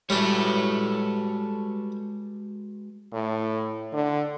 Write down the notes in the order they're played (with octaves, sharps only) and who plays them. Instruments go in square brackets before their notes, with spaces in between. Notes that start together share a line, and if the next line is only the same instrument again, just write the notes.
[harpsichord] G3 D4 [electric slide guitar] G#3 F#4 B4 [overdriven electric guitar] A4 C#5
[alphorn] A2
D3